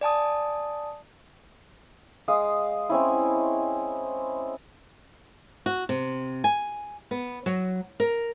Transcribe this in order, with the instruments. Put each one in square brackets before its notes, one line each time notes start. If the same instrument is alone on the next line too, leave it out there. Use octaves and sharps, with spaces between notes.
[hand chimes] D5 G#5 A5 D#6
[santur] G#3 F5 D#6
C4 C#4 E4
[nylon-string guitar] F#4
C3
G#5
B3
F#3
A#4